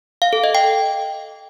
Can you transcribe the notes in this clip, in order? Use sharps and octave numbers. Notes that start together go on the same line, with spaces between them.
F5
A4
D#5
G5